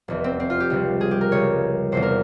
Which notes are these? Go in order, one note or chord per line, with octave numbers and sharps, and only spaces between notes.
F1 E2 E3
C4
C4
F4
G4
C#2 C3 G3
G#4
G4
A#4
C#2 C#3 G3 C#5
E1 E2 C3 C5
A#4